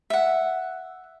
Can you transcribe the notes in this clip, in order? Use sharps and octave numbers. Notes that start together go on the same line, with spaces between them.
E5 F#5